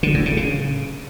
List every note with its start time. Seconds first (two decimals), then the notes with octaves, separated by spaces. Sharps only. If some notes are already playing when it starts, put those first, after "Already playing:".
0.03 D3
0.14 A2
0.26 C#3
0.37 C#3